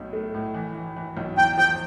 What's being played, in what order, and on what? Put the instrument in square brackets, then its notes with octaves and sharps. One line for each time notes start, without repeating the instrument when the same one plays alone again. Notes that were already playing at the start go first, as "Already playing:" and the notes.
Already playing: [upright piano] B1 A2
A3
A2
E3
E3
E3
B1
[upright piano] E2 [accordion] G5
[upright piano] F3 [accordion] G5